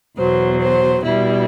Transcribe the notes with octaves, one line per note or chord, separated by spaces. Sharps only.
E2 B2 F#3 C5
C5
B2 G3 E4